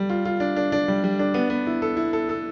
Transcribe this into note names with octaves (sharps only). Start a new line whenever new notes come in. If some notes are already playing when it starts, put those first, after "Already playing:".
Already playing: G3
F4
F4
D4
D4
D4
G3
G3
D4
B3
B3
E4
A4
E4
A4
A4